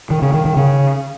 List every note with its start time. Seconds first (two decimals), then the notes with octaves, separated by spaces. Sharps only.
0.10 D#3
0.22 C#3
0.34 D#3
0.45 D#3
0.57 C#3